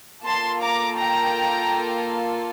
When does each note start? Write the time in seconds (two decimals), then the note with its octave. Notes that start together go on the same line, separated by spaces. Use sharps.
0.24 A#3 F4 A4 A5 C6
0.60 A#5 D6
0.97 G5 A#5